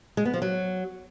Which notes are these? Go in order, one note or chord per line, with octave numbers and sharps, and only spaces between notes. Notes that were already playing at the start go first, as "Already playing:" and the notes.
G#3
B3
F3
F#3